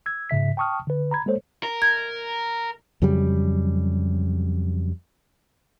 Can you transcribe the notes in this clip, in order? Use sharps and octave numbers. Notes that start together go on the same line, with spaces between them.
E6 G#6
G#2 C#3 E5 B6
G5 A5 C#6 D#6 F6
D3 B4
A#5 B5 G#6
G#3 A#3 A4 C5 C#5
A#4
G#6
F2 C#3 F#3 G3